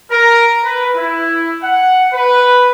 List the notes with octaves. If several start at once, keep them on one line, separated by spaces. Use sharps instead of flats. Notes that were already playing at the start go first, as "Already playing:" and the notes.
A#4
B4
E4
F#5
B4